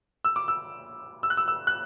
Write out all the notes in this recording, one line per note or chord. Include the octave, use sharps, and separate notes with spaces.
E6
D6
E6
E6
F#6
E6
E6
F#6